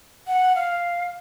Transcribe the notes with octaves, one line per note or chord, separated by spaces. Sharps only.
F#5
F5